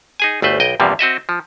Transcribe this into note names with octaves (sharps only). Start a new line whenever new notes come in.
D#4 G#4 G#5
G1 D2 A3 B4 C5
B1 D#5 G5
E2 G2 C3 F3 G3 A#3
C4 F#4 D#5 E5
F3